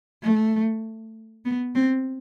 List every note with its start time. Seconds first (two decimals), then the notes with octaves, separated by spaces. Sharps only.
0.23 A3
1.45 B3
1.75 C4